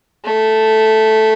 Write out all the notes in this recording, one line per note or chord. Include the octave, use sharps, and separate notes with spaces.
A3